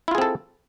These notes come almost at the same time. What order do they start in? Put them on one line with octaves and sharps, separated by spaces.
E4 F4 G#4 C4 A4